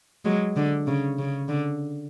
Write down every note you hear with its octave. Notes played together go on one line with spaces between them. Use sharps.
F#3 G#3
D3
C#3
C#3
D3